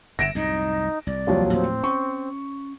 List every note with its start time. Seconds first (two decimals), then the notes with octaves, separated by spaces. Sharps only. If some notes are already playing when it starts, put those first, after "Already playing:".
0.19 G1 G2 E5 A#6 D7 E7
0.35 C2 F#2 A2 D#4
1.07 C2 D5
1.27 D#2 F3 F#3
1.53 A2 C4
1.84 C#4 C#6